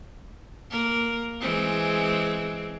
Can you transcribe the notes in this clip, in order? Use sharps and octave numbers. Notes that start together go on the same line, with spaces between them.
A#3 A#4
E3 G#3 C4